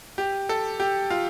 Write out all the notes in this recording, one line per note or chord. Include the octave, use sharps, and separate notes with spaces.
G4
A4
G4
F4